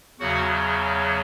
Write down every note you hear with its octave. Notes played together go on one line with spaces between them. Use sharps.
E2 C#3 F#3 F#4 F#5